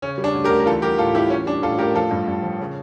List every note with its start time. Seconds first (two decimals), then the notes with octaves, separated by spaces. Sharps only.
0.02 C#3 C#4
0.18 G3
0.24 D4
0.34 D2
0.44 G4 A#4
0.50 D2
0.59 A#4
0.66 E3 F4 A4
0.82 G3 G4 A#4
0.98 A2 F4 A4
1.14 A2 E4 G4
1.30 E3 C#4
1.46 G3 D4
1.62 A2 F4 A4
1.78 A2 G4 A#4
1.95 F3 F4 A4
2.11 G2
2.28 G2
2.43 F3
2.60 C#3